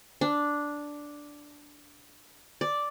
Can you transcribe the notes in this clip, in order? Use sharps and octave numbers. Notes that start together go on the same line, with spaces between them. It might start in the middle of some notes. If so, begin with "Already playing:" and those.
D4
D5